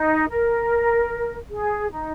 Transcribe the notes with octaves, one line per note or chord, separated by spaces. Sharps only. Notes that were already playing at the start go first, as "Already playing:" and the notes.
Already playing: D#4
A#4
G#4
D#4